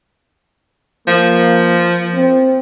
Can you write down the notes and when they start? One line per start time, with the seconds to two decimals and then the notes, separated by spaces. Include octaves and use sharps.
1.08 F3 A#3
2.15 C4